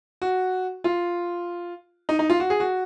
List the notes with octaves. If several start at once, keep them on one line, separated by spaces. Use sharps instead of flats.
F#4
F4
D#4
D#4
F4
F#4
G#4
F#4